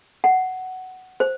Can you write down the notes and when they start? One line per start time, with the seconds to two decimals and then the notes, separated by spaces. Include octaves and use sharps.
0.24 F#5
1.20 C5